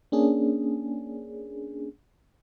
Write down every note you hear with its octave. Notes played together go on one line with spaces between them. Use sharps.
A#3 C#4 D4 G#4